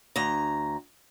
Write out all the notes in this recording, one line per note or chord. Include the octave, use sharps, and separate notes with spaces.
D2 A#5